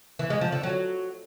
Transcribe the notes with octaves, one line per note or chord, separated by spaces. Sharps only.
E3
G#3
F3
D3
F#3